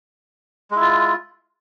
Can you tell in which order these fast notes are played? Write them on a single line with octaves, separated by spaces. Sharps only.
G#3 E4 F4